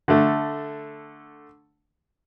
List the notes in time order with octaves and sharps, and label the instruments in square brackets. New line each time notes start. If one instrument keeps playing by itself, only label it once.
[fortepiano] D3 A3